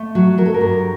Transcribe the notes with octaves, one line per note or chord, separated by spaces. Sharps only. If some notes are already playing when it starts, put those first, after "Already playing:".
Already playing: A3
F#3
F#3 A#4
A4
A#4
G2